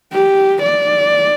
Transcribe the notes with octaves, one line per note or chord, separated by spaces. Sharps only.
G4
D5